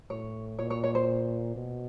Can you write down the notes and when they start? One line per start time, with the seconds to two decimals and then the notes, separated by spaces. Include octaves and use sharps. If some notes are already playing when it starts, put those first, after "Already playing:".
0.10 A2 C#5
0.59 A#2 C#5
0.70 C#5
0.84 C#5
0.95 C5
1.56 B2